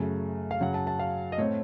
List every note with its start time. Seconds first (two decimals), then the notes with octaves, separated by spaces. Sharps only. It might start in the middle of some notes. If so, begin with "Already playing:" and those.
Already playing: F#2 C#3 A3
0.51 F5
0.61 F#2 C#3 F#3 F#5
0.74 A5
0.87 A5
0.99 F5
1.32 D#5
1.38 A2 A3 C4 C#5